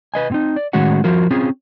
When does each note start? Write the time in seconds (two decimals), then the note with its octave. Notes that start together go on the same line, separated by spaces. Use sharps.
0.14 B4 D#5 G#5
0.30 A2 C4 D#4
0.56 D5
0.73 A2 D#3 G#3 C#4 F#4 F#5
1.04 F3 F4 F#4 A#4
1.31 C4 C#4 F4 G#4